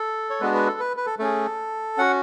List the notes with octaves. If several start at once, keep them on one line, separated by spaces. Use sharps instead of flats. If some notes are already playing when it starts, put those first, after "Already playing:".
Already playing: A4
C#5
G#3 B3 D4 F#4 B4
B4
A4
B4
B4
A4
A3 C#4 G#4 A4
C#4 F#4 F#5